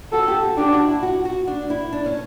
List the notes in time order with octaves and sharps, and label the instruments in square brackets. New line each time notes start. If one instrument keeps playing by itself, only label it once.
[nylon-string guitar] F#4 [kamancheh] A4
[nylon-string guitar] G4
F#4
[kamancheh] D4 [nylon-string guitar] G4
[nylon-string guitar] F#4
E4
F#4
F#4
D4
E4
D4
C#4